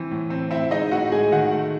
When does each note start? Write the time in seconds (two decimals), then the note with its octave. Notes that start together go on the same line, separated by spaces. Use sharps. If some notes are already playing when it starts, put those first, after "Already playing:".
Already playing: E3 C4
0.11 A2
0.30 C4
0.51 C4 E4 E5
0.71 G#3 D#4 D#5
0.91 A2 F#4 F#5
1.12 G#3 G#4 G#5
1.32 D#3 F#4 F#5
1.52 A3